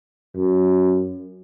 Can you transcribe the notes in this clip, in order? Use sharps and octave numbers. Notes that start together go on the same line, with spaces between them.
F#2